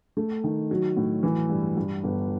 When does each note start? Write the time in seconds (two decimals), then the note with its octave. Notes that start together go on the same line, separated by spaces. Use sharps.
0.17 A3
0.44 D#3
0.71 F#3
0.97 A2
1.23 E3
1.50 G2
1.77 G2
2.04 G1